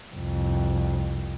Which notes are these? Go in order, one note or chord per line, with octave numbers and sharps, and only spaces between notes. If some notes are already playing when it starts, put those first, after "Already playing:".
C2 F2